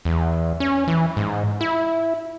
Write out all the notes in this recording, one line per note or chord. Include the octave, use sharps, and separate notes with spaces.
E2
C#4
E3
G#2
E4